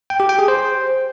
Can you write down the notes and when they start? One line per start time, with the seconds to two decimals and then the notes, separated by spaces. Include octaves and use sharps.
0.10 G5
0.20 G4
0.29 G5
0.39 G#4
0.48 C5